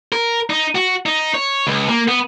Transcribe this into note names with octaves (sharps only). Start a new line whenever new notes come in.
A#4
D#4
F#4
D#4
C#5
C#2
A#3
B3